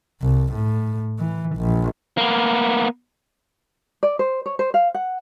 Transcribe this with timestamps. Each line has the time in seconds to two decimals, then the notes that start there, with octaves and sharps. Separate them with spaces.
0.22 C2
0.54 A2
1.19 E3
1.57 A#1
2.18 A#3 B3
4.03 D5
4.19 C5
4.46 C#5
4.59 C5
4.74 F5
4.94 F#5